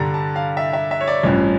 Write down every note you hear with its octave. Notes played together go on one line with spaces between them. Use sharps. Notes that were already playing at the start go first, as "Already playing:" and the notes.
Already playing: G2 D3 G3 A#5
A5
F5
E5
E5
E5
C#5
D5
A1 G2 F3 C#4